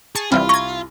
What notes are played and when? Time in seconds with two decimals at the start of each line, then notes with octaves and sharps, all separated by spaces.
0.15 G#4 A5 C#6 C7
0.32 C2 E3 G3 C4 F4 B5 F6
0.49 A#5 C#6 G#6